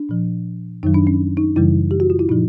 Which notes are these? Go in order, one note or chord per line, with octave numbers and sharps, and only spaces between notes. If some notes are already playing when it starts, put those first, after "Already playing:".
Already playing: D4
A#2 F3
F#2 D#3 F#3 D#4
D4
C#4
D#4
F#2 C#3 E3 G3 E4
G4
F#4
F4
E4
A#2 F3 D#4